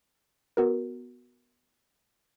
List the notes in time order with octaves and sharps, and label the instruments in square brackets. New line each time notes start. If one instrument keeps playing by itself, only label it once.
[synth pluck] B3 F#4 A#4